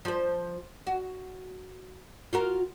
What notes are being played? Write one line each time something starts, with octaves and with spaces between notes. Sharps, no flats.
F3 C5
F#4
F4 F#4 A#4